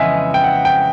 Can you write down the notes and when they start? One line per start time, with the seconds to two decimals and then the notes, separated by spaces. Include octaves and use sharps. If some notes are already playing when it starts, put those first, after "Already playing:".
Already playing: F2 C#3 E3 G#3 B3 D#5 E5
0.34 G5
0.44 F#5
0.65 G5